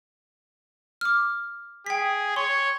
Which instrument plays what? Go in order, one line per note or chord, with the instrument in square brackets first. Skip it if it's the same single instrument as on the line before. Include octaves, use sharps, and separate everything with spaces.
[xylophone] D6 F6
[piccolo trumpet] G#4 [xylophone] G5 B6
[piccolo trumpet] C#5 [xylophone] C6